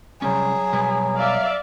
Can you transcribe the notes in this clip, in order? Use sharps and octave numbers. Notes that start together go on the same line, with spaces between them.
C3 F#3 G3 C#4 G#4
B2 G3 B4
D5 E5 F5